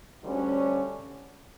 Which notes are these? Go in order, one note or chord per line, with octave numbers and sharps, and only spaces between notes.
D2 D3 G3 C#4